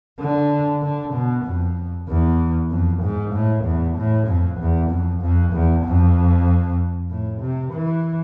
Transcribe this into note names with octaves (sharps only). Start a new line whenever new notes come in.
D3
D3
B2
F2
E2
F2
G#2
A2
E2
A2
F2
E2
F2
F2
E2
F2
A2
C3
E3